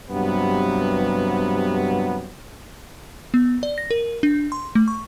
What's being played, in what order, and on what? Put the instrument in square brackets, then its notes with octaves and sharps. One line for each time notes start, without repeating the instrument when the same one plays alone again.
[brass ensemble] G2 C3 F#3 B3
[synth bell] B3
D5
A#6
A#4
D4
C6
A3
C#6